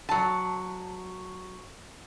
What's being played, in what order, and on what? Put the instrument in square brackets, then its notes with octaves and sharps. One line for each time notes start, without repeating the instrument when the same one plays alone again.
[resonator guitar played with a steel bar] F#3 A5